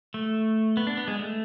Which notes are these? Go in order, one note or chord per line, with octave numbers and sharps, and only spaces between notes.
A3
B3
D4
B3
G#3
A3